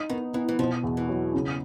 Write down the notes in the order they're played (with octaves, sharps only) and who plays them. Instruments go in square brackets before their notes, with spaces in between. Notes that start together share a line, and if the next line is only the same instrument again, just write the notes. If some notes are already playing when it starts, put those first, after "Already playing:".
Already playing: [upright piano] D#4
[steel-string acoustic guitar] D#3 [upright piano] B3
[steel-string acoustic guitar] E3 [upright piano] B3
[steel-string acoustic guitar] E3
[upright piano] B2 [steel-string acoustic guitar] F3
[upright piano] E2
[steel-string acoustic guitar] E3
[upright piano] F#3
C#3